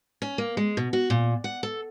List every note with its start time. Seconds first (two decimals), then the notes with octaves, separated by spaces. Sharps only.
0.22 C#4
0.38 A#3
0.57 G#3
0.77 B2
0.93 F#4
1.10 A#2
1.44 F#5
1.63 A4